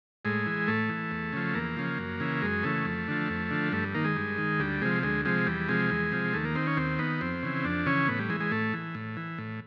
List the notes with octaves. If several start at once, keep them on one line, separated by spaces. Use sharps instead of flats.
A2 G#3
E3
A2 A3
E3
E2
C#3 F3
E2 A#3
C#3 F3
F#2
C#3 E3
F#2 G#3
C#3 E3 A3
F2
D3 F3
F2
D3 F3
G2 A3
D#3 A#3
G#3
G2
D#3
D2 G3
C3 F3 G#3
D2 G#3
C3 F3 G#3
E2 G3
C3 F3 G#3
E2
C3 F3
D#2 A3
A#3
D#3 C4
C#4
D#2 C4
D#3 B3
F2 C4
C#3 E3
F2 D4
C#3 E3 C#4
A2 B3
G3
E3 G#3
G#3
A2 A3
E3
A2
E3
A2